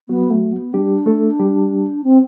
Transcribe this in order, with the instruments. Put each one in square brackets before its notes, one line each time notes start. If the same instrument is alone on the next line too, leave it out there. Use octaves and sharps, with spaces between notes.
[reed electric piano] F#3 F#4 [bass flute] B3
[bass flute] A3
B3
[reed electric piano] G3 G4 [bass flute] D4
[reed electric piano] A3 A4
G3 G4
[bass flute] C4